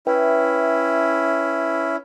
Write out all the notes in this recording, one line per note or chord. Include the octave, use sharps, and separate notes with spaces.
C#4 E4 B4 E5 G5